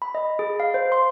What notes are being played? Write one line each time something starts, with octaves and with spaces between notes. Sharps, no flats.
B5
D#5
G#4
F5
C5
C6